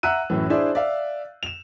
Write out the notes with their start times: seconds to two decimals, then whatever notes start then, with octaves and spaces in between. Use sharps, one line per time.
0.03 E5 F#5 A#5 E6 F#6 D#7
0.30 F#2 A2 E3
0.50 D4 E4 G#4 C5 D5 E5
0.75 D5 E5 F5
1.43 E7 F7